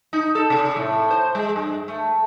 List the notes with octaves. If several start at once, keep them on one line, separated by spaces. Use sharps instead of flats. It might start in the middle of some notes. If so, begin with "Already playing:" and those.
D#4
A4
C3
A2
C5
G#3
G2
A3